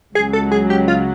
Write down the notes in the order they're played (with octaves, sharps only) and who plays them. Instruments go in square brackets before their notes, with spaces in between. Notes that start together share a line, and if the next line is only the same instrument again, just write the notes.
[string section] C#2 C#3 F#3 [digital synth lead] G#4
[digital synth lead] A4
G#4
G4
F4